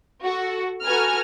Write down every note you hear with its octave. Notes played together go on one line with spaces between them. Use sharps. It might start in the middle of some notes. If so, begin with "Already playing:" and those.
F#4 A4
F#4 A4 B4 G#5 A#5 F6